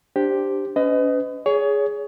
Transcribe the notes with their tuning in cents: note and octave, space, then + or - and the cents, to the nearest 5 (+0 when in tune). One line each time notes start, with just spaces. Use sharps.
D4 +0 G4 +0 C5 +0
C#4 +40 B4 +40 D#5 +0
G#4 +0 C#5 +25